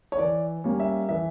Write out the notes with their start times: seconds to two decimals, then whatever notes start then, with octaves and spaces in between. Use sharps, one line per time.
0.12 C#5
0.19 E3 D5
0.64 G3 A#3 C#4
0.80 E5
1.09 E3 E5